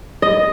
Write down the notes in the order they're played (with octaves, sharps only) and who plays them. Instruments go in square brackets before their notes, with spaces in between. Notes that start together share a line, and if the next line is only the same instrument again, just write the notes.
[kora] D#5